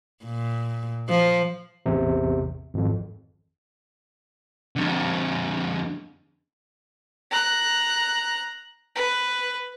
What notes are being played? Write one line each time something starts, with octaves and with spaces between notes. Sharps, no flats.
A#2
F3
A1 E2 C3
G#1 F2
F2 D3
A#5 F#6
B4